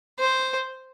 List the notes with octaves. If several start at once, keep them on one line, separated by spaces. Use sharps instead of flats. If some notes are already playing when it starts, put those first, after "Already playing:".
C5